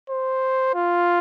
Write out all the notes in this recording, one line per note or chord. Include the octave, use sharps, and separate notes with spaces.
C5
F4